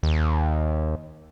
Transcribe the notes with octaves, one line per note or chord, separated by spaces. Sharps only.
D#2